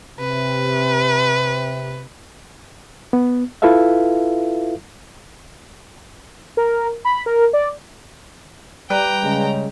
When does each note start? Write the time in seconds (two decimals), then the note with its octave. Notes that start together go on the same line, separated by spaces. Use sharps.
0.19 C3 B4
3.13 B3
3.62 E4 F4 A4 B4 E5 F5
6.57 A#4
7.05 B5
7.26 A#4
7.53 D5
8.90 G3 B4 D5 G5 A#5
9.23 C#3 G#3